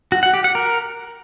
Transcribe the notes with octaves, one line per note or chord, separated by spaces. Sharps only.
F#4
F#5
G4
F#5
A#4